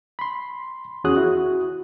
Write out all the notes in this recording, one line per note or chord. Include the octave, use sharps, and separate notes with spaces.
B5 C6
E2 C#4 F#4 G#4 D#6 F#6
E4 F#4